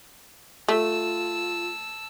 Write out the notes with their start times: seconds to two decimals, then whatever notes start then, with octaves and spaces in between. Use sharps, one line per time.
0.68 A3 F4 A5 E6